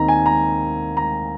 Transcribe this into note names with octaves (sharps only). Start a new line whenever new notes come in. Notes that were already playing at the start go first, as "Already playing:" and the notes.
Already playing: D#2 D#3 C4 D#4 A#5
G#5
A#5
A#5